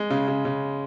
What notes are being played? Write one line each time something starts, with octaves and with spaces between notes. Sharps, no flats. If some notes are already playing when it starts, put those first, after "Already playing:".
Already playing: G#3
C#3
C#3
C#3